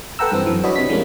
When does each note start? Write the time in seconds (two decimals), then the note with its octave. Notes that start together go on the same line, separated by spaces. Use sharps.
0.19 A4 B4 F#5 G5 A#5 E6
0.31 G2 E3 C4
0.46 F#2 E3
0.63 D4 F#4 B4 C#5 D#5 B5
0.76 C3 B6
0.89 E3 G3 G#3 A#3 C#4